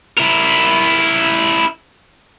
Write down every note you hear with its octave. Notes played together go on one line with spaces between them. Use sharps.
E4 A#4